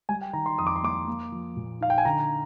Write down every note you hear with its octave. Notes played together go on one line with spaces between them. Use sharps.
G3 G#5
G5
D#3 A#5
C6
F2 D#6
D6
C6
A#3 D6
A#3
F3
A#2
D#4 F5
G5
G#5
D3 A#5